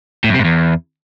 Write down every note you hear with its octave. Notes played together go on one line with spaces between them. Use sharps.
A2
F#2
C3
G#2
E2